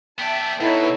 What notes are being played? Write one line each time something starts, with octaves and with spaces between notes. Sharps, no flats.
B3 D5 E5 G5 A5
B2 B3 D#4 E4 A4 B4 C#5